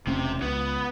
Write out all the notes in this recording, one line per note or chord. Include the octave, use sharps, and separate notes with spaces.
E1 C3 A3 C#4
C#2 B3